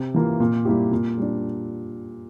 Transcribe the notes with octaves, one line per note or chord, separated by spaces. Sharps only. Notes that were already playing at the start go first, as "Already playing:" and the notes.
Already playing: C3
E3 A#3 F4
A#2
G3 A#3 E4 G4
A#2
G3 D4